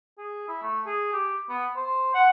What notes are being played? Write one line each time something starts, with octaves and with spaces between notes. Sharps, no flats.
G#4
E4
A3
G#4
G4
B3
C5
F#5